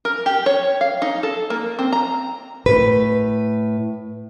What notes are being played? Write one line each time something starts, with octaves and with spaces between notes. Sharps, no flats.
A#4
G4
C#5
F5
D#4
A4
A#3
C4
A#5
A2 B4